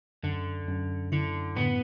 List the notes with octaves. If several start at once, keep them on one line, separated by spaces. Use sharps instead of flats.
F#2 D3
F#2
D3 E4
A2 B3